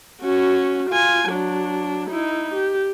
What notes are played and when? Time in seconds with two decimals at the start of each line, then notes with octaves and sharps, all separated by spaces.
0.21 C#4 F#4
0.90 F4 G#5
1.29 F#3 D4
2.10 D#4 E4
2.54 G4